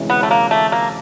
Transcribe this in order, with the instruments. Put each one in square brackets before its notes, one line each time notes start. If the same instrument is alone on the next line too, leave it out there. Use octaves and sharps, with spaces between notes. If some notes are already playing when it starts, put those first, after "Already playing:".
Already playing: [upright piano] D2 C3 E3 G#3 C#4
[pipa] B3
A3
A#3
A3
A#3